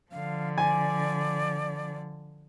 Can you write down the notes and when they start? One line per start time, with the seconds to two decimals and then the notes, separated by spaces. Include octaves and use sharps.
0.12 D3 F3 F5
0.58 D5 G#5